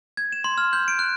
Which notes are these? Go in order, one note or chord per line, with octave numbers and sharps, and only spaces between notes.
G#6
E7
C6
F6
G6
D7
F#6